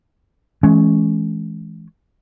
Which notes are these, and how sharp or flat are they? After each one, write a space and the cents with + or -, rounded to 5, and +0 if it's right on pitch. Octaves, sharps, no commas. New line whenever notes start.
E3 -5 G#3 +30 C#4 +0